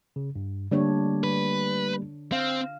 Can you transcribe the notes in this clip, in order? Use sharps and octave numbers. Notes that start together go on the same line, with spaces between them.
C#3
G2
D3 G3 A3 A#3 D4 C#5
B4
C4 F5